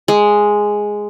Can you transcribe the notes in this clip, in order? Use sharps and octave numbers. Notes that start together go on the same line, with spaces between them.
G#3